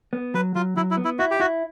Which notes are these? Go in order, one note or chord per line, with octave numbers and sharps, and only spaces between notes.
B3
F#3 B4
F#3 F4
F#3 E4
E4
B3
E4
E4 F#4
G4
E4 F#4